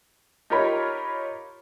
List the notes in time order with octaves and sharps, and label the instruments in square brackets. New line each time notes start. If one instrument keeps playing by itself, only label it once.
[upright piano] D#4 F4 G4 A#4 C#5 B5